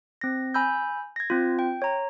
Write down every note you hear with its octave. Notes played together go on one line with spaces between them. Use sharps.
C4 A#6
G#5 B5 E6 G6
G#6 A#6
C4 F4
G5
C#5 A#5